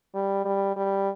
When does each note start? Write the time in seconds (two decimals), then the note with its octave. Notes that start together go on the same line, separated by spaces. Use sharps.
0.15 G3
0.45 G3
0.76 G3